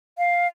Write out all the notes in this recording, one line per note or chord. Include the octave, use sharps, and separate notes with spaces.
F5